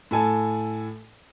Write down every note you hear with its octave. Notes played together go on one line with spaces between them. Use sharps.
A2 A4 G#5 A5